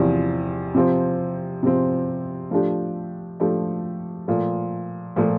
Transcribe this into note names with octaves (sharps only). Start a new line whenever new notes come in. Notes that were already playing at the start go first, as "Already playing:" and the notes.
Already playing: E2 C3 F3
C3 F3 C4
C3 F3 C4
F3 A3 D4 G4
F3 A3 D4 G4
A#2 F3 A3
A#2 F3 A3